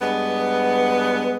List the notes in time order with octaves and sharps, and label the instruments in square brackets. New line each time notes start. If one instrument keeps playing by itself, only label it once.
[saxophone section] G2 G#3 B3